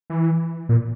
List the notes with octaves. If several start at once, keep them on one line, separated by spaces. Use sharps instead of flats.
E3
A#2